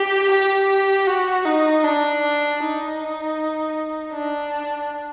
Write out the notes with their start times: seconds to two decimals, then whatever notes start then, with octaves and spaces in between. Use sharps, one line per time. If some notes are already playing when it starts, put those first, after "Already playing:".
Already playing: G4
0.31 G4
1.07 F#4
1.45 D#4
1.84 D4
2.60 D#4
4.13 D4